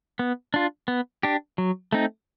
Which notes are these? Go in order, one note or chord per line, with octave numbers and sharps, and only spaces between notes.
B3
D4 F4
B3
D4 G4
F#3
A3 C4 D#4